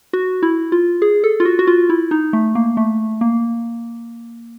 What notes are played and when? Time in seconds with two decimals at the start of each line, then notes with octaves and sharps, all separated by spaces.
0.13 F#4
0.43 E4
0.72 F4
1.02 G#4
1.24 A4
1.40 F4
1.45 F#4
1.59 F#4
1.67 F4
1.89 E4
2.11 D#4
2.33 A3
2.55 A#3
2.77 A3
3.21 A#3